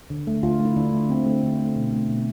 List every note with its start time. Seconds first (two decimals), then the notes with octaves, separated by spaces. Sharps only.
0.10 D3
0.27 A3
0.43 D3 F4
0.60 A3
0.65 E4
0.76 D3 D4
0.93 A3
1.09 D3 C4
1.26 A3
1.43 D3
1.59 A3
1.76 B2
1.92 A3
2.09 B2